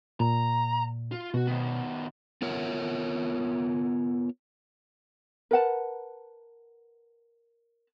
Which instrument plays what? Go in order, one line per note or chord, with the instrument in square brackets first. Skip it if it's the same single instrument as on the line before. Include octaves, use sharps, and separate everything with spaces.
[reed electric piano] A#2 [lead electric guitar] A#5
[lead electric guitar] F4
[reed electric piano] B2 [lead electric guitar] F#4
[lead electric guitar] D#3 B3
[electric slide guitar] B3 F4 A#4 C#5 E5 F#5
[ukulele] A#4 B4 F#5 A5